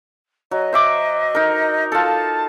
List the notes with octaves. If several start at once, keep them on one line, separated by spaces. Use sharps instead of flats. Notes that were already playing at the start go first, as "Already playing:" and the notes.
F#3 D#5
C5 E5 D6
D#4 A#4
F4 A4 A5